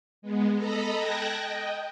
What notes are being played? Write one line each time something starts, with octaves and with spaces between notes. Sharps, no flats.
G#3 B3
A4 D#5 A#5 B5
G5 A5 F#6 G#6 A#6
D#5 G5